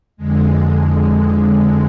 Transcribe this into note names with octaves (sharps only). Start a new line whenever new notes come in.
F2 D3 G#3